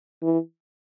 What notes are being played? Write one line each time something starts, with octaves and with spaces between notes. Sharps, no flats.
E3